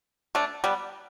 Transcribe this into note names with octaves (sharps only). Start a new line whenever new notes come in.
A3 D4
G3 B3